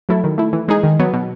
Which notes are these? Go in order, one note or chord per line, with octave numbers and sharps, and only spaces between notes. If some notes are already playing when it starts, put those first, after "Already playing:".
F#3 A3 E4 A4
D#3
A3 E4
E3
G#3 D#4 G#4
D#3
F#3 B3
B2